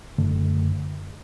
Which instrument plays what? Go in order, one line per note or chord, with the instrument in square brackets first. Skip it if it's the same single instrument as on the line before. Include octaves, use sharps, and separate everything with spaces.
[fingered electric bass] F#1 F#2 D3 A3